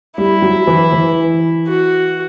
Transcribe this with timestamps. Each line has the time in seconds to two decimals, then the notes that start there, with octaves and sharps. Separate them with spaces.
0.17 G3 E4
0.42 F#3
0.67 E3
0.93 E3
1.68 F#4